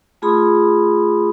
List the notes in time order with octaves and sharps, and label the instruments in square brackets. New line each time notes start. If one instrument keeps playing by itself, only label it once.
[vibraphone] A3 F4 G#4 B5 C6 D#6